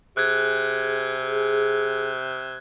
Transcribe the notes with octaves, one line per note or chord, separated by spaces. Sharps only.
C3 G#4 F#6 G#6